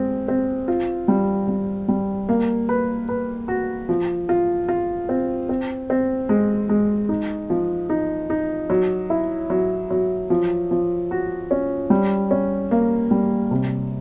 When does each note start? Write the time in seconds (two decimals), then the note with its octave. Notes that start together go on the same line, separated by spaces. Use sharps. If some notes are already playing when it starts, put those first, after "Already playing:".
Already playing: G#3 C4
0.28 C4
0.68 F4
1.08 G3
1.48 G3
1.88 G3
2.29 A#3
2.69 B4
3.09 B4
3.48 F#4
3.89 F3
4.29 F4
4.68 F4
5.09 C4
5.49 C4
5.90 C4
6.29 G#3
6.69 G#3
7.09 D#4
7.50 F3
7.90 D#4
8.30 D#4
8.70 F#3
9.10 E4
9.50 F#3
9.90 F#3
10.30 F3
10.71 F3
11.11 F#4
11.51 C#4
11.90 G3
12.31 C#4
12.71 A#3
13.11 G3
13.51 C3